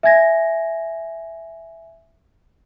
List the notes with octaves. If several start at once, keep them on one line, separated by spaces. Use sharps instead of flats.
E5 G#5 G#6 A#6